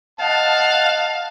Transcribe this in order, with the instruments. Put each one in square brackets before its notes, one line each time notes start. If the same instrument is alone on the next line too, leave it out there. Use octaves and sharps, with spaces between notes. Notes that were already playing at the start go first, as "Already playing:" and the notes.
[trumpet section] D#5 F#5 A5 [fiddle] F5